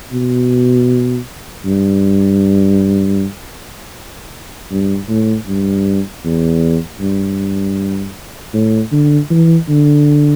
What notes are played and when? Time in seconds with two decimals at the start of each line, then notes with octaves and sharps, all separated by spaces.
0.12 B2
1.66 G2
4.71 G2
5.09 A2
5.47 G2
6.24 E2
7.00 G2
8.54 A2
8.92 D3
9.30 E3
9.69 D3